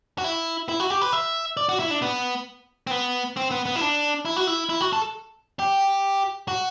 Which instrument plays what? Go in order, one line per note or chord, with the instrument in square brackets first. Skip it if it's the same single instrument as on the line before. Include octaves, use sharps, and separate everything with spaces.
[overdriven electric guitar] F#4
E4
E4
F#4
G4
B4
E5
D5
F#4
E4
D4
B3
C4
B3
C4
B3
B3
E4
D4
E4
F#4
E4
E4
F#4
A4
G4
F#4